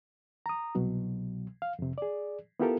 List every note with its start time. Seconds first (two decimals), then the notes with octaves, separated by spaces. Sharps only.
0.46 A#5 D#6
0.75 C2 B2 F#3
1.62 F5
1.79 F2 C3
1.98 G#4 D5
2.60 B3 E4 F4 G4 A4 A#4